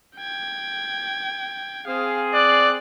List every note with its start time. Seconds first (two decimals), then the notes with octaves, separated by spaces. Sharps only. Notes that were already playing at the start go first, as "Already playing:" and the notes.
0.17 G5 G#6
1.87 C4 G#4 F5
2.34 D5 F#6